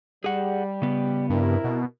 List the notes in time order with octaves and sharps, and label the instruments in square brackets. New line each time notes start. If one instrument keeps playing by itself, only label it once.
[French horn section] G3 [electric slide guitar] G#4 F#5
[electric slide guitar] C#3 B3
[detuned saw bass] G2 [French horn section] C3 E4 A#4
[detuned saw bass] B2